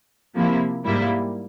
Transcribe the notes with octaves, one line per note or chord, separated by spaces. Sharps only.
C3 F3 A#3 E4
G#2 G3 A#3 E4